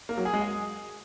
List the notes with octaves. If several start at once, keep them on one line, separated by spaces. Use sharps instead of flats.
A#3
F#3
G#4
G#3
G#4